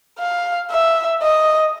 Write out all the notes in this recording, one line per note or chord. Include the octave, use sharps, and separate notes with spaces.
F5
E5
D#5